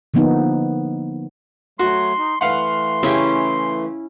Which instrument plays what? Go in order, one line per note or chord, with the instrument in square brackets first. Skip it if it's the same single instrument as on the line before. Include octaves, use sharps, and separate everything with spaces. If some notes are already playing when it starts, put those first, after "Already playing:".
[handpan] D3 F3 A#3 B3 D#4
[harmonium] F#3 A3 [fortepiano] F#4 [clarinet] C6
[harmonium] D#4
[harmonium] E3 A3 [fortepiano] B4 F5 F#5 [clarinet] C6
[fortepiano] C#3 G4 [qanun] C#4 E4